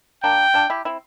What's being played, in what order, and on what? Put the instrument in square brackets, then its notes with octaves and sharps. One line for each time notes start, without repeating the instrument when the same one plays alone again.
[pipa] A#3 D4 [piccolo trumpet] G5
[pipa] D4 F4
E4 G4
C4 E4